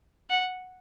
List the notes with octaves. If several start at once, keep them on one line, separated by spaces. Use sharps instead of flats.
F#5